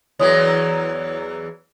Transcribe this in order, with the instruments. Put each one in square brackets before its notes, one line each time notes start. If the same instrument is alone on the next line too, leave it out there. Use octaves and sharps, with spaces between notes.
[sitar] E2 E3 F#3 [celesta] C#5 D#6